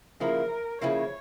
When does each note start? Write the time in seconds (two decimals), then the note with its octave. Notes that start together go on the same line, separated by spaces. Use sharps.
0.20 C#3 F3 A#3 E4 A#4
0.81 C#3 F3 A#3 E4 C#5